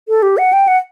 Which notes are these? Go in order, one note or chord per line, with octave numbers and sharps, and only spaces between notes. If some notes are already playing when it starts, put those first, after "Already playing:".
A4
G4
F#5
G5
F#5